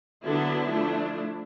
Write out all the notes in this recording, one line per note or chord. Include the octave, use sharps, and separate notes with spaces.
D3 F#3 B3 D4 E4
F3 A3 D4